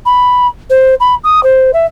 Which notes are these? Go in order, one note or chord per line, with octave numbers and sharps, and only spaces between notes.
B5
C5
B5
D#6
C5
E5